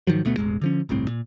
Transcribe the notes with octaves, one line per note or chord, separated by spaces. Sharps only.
G#2 D#3 F3 F#3
D2 B2 A3 B3
E1 A1 E2 G#3
D3 F3 C#4
G1 C2 A2 C4
A#2